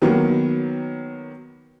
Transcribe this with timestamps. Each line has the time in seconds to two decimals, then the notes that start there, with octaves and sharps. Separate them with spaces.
0.02 D#3 F#3 A#3 B3